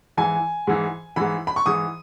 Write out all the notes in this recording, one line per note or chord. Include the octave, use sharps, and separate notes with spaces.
G#2 E3 G#5
G#2 E3
G#2 E3 B5
B5
C#6
G#2 E3 D#6